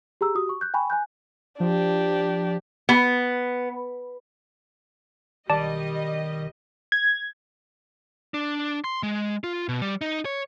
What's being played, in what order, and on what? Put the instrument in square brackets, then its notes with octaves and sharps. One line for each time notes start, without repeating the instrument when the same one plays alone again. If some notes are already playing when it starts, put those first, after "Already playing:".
[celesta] G4 G#4 A#5 E6
F#4 G4 D#6
C#6
F#6 G6
G5 G#5 B5 C#6
G#5 F#6 G6
[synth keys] F3 [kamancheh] D4 G4
[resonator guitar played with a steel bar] B3
[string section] B1 G3 D#5 [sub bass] D#3 [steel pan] D5 [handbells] A5
[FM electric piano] G#6
[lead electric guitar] D4
C6
G#3
F4
B2
G3
D#4
C#5